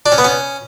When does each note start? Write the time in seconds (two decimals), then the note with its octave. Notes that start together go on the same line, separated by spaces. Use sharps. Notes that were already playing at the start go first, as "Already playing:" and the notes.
0.06 D4
0.12 C#4
0.18 B3
0.24 C#4